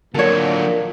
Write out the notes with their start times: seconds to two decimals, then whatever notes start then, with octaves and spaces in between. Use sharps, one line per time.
0.15 A#2 D3 D#3 F#3 A#3 A4 C#5